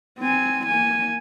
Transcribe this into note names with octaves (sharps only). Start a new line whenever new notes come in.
C4 G#5
A#3 G#5